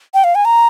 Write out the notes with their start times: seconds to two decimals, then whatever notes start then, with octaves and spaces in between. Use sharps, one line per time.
0.14 G5
0.24 F5
0.35 G#5
0.45 A#5